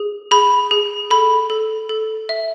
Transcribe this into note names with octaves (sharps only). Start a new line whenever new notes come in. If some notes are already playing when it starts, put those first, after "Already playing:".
Already playing: G#4
G#4 B5
G#4
A4 B5
A4
A4
E5